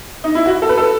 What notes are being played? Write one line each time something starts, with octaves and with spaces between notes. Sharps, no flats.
D#4
E4
F#4
A4
B4
A4